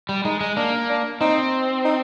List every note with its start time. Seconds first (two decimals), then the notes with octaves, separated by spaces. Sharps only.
0.09 G3
0.25 G#3 D#4
0.41 G#3
0.56 A#3 D4
0.89 D4
1.21 C4 D#4
1.85 D#4